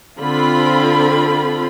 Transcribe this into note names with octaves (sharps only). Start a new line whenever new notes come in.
D3 C4 F4 B5